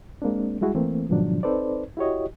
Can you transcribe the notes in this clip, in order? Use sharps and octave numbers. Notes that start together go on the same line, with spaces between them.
G#3 A#3 C4 D4
G3 G#3 E4 F#4 G#4
E3 A3 A#3 C4
G#2 B2 D#3 F3 F#3 D4
C4 D#4 A4 B4 C5 D5
E4 F#4 G4 C#5 D#5